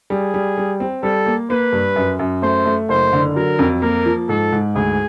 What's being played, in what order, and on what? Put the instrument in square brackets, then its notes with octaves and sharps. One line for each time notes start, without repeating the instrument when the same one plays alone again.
[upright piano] G3 [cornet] G#4
[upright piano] G3
G3
C4
[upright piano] G3 [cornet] A4
[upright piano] A#3
[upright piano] A#3 [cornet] B4
[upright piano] G2
F#2
F#2
[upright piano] A3 [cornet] C5
[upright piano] A3
[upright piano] F#1 [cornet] C5
[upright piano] D3
[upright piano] F#3 [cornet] A#4
[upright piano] F2
[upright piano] A#3 [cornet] A#4
[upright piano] F3
[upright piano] G#2 [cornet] A4
[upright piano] G#2
[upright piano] D2 [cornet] G#4